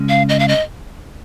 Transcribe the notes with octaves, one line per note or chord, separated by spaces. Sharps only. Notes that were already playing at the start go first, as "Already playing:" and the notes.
Already playing: C#3 G#3 C#4
F5
D#5
F5
D#5